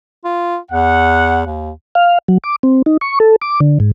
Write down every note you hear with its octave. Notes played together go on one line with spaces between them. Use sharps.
F4
E2 F#5
D#2
F5
F#3
D6
C4
D#4
C#6
A4
D6
D3
G#2